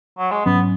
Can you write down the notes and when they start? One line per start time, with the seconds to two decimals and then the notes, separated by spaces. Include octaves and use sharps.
0.18 F#3
0.31 G#3
0.45 G#2 F#3 B3 C#4